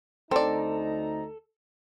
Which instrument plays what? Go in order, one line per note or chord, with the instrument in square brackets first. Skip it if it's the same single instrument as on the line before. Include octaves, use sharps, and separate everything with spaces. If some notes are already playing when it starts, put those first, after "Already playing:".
[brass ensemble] D2 D#4 A#5 [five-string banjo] C4 D5 [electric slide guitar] A4